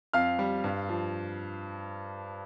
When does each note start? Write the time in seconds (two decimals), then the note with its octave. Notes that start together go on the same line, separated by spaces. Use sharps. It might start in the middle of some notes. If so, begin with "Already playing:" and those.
0.13 F2 F5 F6
0.39 G3
0.64 G2
0.89 F3